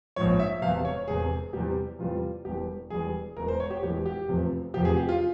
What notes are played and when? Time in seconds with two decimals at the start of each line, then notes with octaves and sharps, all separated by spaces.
0.16 A#1 G#2 F3 C#5
0.39 E5
0.62 E1 E2 C3 F5
0.85 C#5
1.08 E1 E2 C3 G#4
1.53 E2 C3 E3 G3 G4
1.99 E2 C3 E3 G3 F4
2.45 E1 E2 E3 G3 G4
2.90 E1 E2 E3 G3 G#4
3.37 E1 E2 E3 G#3 A#4
3.48 C5
3.60 C#5
3.70 G4
3.82 E1 E2 E3 G#3 G4
4.06 G4
4.28 F1 E2 C3 F3
4.74 F1 E2 C3 F3 G4
4.85 G#4
4.97 G4
5.09 F4